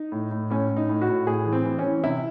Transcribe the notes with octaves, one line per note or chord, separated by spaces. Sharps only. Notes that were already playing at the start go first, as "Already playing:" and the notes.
Already playing: D#4
A2
A2
A2 C#4
A2
D#4
A2
F#4
A2
A2 G#4
E3
C4
E3
C#4
E3
C3 E4